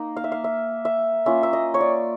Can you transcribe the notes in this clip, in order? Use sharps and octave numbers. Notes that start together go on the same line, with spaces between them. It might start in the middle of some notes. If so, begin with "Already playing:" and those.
Already playing: A#3 D#4
F5
E5
F5
E5
E5
A#3 C#4 F4 E5
E5
D#5
C#5
D5